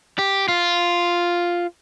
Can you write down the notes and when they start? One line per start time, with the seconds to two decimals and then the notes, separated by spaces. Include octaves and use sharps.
0.19 G4
0.48 F4